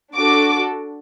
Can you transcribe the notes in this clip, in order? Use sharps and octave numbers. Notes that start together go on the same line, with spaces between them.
D4 F#4 A4 D6